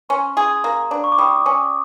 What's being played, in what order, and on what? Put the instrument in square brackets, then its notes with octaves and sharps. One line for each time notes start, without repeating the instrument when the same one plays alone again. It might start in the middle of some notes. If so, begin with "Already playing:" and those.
[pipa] C#4 [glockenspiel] C6
[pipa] G#4
A#3
D4
[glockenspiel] C#6
D6
[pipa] G3 [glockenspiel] D#6
[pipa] C#4